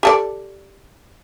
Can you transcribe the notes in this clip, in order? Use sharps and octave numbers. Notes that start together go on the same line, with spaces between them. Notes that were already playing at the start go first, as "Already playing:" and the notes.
G4 A4 D5